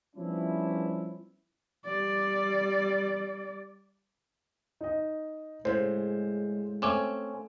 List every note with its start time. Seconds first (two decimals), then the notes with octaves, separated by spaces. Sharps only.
0.15 F3 G3 B3 C#4 D4 E4
1.85 G3 D5
4.81 D#4 D#5
5.65 A2 C#3 G#3 C5
6.82 A3 C4 C#4 G#5 D6 E7